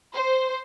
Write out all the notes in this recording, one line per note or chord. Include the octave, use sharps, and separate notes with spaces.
C5